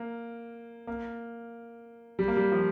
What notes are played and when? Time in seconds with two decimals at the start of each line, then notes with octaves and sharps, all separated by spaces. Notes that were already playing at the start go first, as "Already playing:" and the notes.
Already playing: A#3
0.87 A#3
2.19 G3
2.28 A#3
2.37 G3
2.52 F3